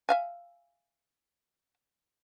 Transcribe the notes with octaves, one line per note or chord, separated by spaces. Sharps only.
E5 F5 G#5